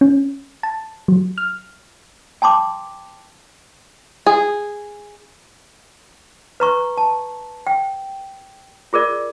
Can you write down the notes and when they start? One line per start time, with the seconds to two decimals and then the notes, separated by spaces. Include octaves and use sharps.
0.01 C#4
0.63 A5
1.08 F#3
1.38 F6
2.42 G5 A5 C6 D6
4.27 G#4
6.60 B4 A#5 C#6
6.98 A5
7.67 G5
8.93 F4 G#4 A#4 D5